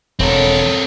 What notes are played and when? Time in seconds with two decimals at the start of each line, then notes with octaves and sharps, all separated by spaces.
0.19 E1 C4 A4 A#4 C#5